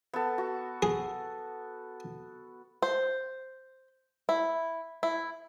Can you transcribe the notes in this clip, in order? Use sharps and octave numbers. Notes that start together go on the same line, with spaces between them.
B3 A4
F#4
G#4
C5
E4
E4